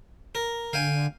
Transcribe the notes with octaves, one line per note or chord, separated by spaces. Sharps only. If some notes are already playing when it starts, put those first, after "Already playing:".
A#4
D3 F5 G5 G#5